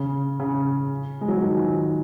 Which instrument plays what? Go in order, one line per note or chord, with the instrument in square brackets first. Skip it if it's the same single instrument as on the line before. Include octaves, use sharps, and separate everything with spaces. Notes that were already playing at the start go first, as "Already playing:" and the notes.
Already playing: [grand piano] C#3
C#3
G#3
F#3
F3
D#3